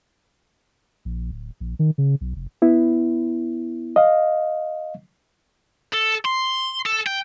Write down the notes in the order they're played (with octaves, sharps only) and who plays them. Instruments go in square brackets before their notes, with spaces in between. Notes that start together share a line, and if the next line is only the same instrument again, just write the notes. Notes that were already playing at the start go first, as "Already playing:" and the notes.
[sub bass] A#1
D1
A#1
D#3
C#3
B1
F1
[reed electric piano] B3 E4
D#5 F5
[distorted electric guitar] A4
C6
A4
G5